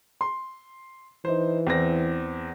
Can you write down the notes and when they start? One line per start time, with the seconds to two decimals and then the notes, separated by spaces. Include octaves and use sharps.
0.21 C6
1.25 E3 D#4 C5
1.67 E2 C4 A#6